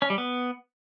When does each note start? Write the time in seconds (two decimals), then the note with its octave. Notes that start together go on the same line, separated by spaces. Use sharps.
0.02 C#4
0.10 G3
0.18 B3